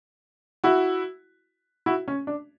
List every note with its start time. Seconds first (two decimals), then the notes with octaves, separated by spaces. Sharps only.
0.64 E4 F#4
1.86 E4 F#4
2.08 C#4
2.27 D4